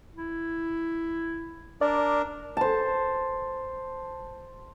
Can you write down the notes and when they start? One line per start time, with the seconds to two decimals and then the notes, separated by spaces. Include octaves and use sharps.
0.15 E4
1.81 D4 A#4 D5
2.57 C5 A5